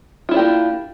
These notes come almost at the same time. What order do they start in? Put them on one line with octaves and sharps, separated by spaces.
F4 E4 D4 G4 A#3